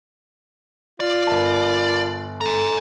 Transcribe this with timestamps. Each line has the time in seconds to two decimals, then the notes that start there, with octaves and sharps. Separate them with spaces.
1.00 F4 D5
1.27 G1 A#4 A5 B5
2.41 A4 G#5 A#5